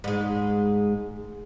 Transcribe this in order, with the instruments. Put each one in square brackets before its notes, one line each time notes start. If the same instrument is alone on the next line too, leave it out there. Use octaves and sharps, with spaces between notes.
[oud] G#2 G#3